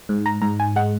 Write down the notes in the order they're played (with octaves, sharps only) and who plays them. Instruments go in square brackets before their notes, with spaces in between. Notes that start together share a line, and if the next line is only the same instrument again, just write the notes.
[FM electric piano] G#2
A#5
G#2 A#5
G#5
G#3 F#5